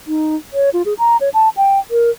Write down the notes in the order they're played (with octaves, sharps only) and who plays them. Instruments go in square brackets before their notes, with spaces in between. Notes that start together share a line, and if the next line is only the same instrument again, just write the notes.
[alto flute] D#4
C#5
F4
G#4
A#5
C#5
A5
G5
A#4